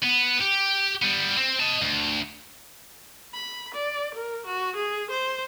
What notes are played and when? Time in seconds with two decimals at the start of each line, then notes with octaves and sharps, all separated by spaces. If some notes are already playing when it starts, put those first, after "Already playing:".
0.03 B3
0.41 G4
1.02 G3 B3
1.37 C4
1.60 D#5 A5
1.81 D2
3.34 B5
3.74 D5
4.15 A#4
4.46 F#4
4.76 G#4
5.11 C5